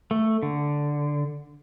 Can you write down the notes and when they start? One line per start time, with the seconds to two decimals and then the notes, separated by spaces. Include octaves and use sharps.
0.11 A3
0.43 D3